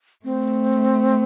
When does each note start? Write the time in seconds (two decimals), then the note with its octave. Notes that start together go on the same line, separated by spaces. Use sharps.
0.24 A3 C4